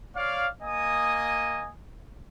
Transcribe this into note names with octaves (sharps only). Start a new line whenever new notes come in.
C#5 D5 F5
A#3 D#5 G#5 D#6